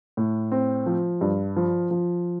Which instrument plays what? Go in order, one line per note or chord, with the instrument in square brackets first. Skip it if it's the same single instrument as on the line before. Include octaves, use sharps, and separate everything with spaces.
[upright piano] A2
C4
F3
G2
F3
F3